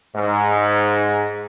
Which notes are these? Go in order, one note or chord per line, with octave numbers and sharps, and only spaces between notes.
G#2